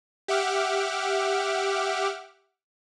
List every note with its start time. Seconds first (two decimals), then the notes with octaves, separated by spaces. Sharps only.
0.28 G4 E5 F#5 D6 F6